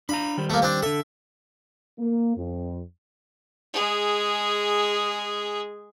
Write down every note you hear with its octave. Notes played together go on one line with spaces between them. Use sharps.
D4 F5 A#5 B5
D#3 G3 C5
A3 A#3
C4 D4
D3 A4 E5
A#3
F2
G#3 G#4